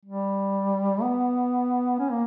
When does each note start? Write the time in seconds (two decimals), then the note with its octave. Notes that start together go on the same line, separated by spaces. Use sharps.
0.05 G3
1.02 B3
1.99 C#4
2.11 A#3